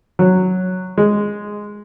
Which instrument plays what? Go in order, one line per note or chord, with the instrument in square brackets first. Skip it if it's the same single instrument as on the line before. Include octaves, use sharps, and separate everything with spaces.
[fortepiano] F#3
G#3